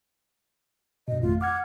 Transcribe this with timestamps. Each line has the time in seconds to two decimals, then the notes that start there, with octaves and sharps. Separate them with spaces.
1.08 G2 B2 D#5
1.21 G#1 F2 A3 F4
1.41 F#5 D6 F6 G#6